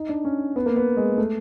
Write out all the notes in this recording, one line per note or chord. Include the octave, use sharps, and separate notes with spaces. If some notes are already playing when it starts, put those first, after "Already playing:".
Already playing: D#4
D4
C#4
B3
A#3
B3
G#3
A3